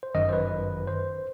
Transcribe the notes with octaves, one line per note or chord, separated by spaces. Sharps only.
C5
G1 F#2 D#3 D#5
C5
B4
C5